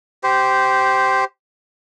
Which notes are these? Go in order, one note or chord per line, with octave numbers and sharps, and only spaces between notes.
G4 C5